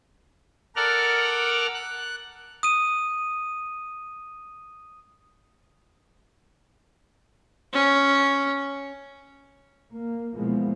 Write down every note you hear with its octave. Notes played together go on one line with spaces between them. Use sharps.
A4 A#4 D5 F#5 F6
F#6
D#6 D#7
C#4
A#3
B2 E3 F3 G#3 A#3 B3